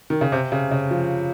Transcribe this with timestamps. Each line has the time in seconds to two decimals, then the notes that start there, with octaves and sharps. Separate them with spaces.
0.10 D#3
0.21 C#3
0.32 C3
0.52 C#3
0.71 C#3
0.91 F3